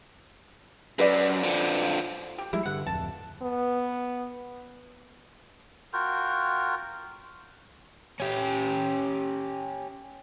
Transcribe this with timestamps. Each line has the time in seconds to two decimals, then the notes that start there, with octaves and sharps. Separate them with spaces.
0.99 F#2 B4 D5
1.43 D3 F3
2.38 G4
2.53 F3 G3 G#3 E4
2.66 G2 D3 F#5
2.86 D1 F2 A5
3.42 B3
5.93 F4 F#4 A#4 G5
8.20 C#4 G4